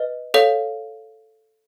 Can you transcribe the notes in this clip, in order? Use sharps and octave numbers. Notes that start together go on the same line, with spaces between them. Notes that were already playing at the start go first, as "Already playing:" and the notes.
Already playing: B4 D#5
A4 C#5 F5